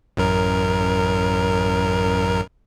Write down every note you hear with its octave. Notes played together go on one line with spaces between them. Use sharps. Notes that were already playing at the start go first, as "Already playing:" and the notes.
A1 F#2 A#4